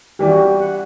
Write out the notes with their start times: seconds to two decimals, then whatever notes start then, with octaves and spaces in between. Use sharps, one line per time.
0.19 E3 G3 D4 G4
0.28 F#4
0.36 G4
0.60 F#5